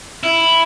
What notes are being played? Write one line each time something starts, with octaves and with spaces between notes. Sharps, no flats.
E4